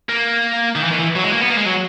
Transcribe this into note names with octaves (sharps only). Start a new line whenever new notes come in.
A#3
D#3
E3
D#3
E3
F#3
G#3
A#3
B3
A#3
G#3
F#3